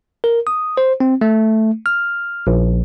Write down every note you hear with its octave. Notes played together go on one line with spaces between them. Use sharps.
A#4
D#6
C5
C4
A3
F6
A#1